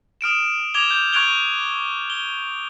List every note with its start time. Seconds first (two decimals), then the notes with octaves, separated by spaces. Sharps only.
0.21 D#6 F6 D7 E7
0.74 D6 G#6 E7 F7 G7
0.91 G6
1.13 C#6 F#6 G#6 D7 F7 G7
2.10 G7